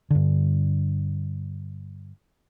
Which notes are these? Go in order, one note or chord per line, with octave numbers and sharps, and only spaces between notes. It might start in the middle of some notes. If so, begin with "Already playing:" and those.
G2 D3